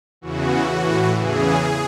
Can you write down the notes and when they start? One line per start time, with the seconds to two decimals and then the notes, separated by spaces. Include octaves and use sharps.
0.21 E2 C#3 E3 F#4
0.70 A2 E3
1.17 E2 C#3 E3 G#4